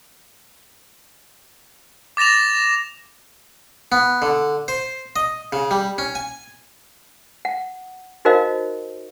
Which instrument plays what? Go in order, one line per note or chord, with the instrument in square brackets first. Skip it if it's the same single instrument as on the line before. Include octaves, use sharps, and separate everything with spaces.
[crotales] D6 A6 A#6 E7 F7
[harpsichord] B3
D3
C5
D#5
C#3
G3
C#4
G#5
[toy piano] F#5
D#4 F#4 A#4 C5 D#5 F5